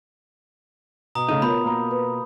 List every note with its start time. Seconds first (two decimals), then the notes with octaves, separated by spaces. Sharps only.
1.15 B2 A#5 D#6
1.29 C#3 A3 D#4
1.42 B2 B3 F4 A#4 C#5 B5 G6
1.64 A#3 A#5
1.91 B4